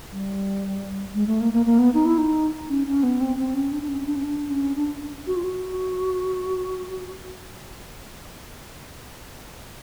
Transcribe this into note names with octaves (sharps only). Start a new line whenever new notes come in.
G3
G#3
A3
A#3
A#3
A#3
B3
D#4
E4
D#4
C#4
C#4
B3
C4
C4
C#4
D4
D4
C#4
C#4
D4
C#4
D4
C#4
D4
F#4
F4
F#4